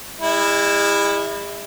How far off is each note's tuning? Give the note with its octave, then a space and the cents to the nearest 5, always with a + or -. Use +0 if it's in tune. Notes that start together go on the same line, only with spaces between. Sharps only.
G#3 -45 E4 +0